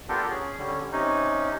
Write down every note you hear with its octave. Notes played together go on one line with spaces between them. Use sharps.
B3 D4 F4 G4 A4 A#4
C#4 G#4
D3 G3 C#4
C3 C#4 D#4